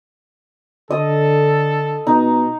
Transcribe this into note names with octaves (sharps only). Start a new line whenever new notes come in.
D3 A4 D#5
B2 D#4